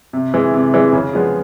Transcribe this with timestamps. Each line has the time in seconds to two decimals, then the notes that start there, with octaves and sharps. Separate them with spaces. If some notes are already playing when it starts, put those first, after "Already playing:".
0.13 C3
0.34 E3 G#3
0.54 C3
0.74 E3 G#3
0.93 C#3
1.13 F3 G#3 B3